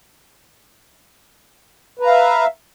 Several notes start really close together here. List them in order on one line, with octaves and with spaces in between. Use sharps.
B4 A#5 F5 E5